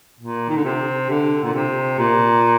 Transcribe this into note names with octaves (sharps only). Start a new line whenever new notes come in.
A#2
D#3
D3
C3
D3
A#2
C3
A#2